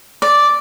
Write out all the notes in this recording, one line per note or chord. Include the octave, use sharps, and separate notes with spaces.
D5